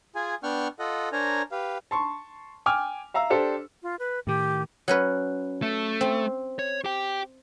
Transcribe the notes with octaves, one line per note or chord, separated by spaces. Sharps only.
F4 G#4 G#5
B3 D4 F#5 G5 C#6 F6
F4 A4 D#5 F#5
D4 A#4 C5 C#5 G#5 A#5
G4 B4 F5
A5 C6 C#6
G5 G#5 D6 F6
E5 F5 A#5 E6
D4 G4 A4 C5
F4
B4
A2 D#3 G4
F#3 C#4 B4
A3
C4
C#5
G4 G5